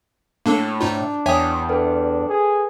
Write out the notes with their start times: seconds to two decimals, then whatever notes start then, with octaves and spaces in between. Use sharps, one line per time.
0.46 A2 A#3 D4 A4
0.81 G#2 D4 D#4 F4
1.26 E2 C#5 E5 G5 G#5 D#6
1.69 D4 A4 B4 G5
2.29 G#4